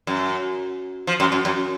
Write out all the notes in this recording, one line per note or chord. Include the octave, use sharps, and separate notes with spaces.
F#2
F3
F#2
F#2
F#2